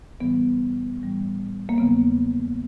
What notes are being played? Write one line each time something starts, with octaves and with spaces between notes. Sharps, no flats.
A2 E3 G3 B3
A2 E3 G3
A#3
E2 C#3 F#3 B3